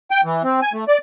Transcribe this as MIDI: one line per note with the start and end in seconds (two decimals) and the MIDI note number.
0.11 0.21 79
0.24 0.42 52
0.44 0.60 60
0.62 0.72 80
0.73 0.84 57
0.88 0.98 74